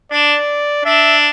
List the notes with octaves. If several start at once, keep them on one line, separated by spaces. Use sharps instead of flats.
D4 D5
D4 E5